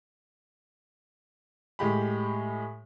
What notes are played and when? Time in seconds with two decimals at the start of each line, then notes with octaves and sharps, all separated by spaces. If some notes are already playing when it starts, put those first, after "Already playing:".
1.79 A2 G#3 G4 B5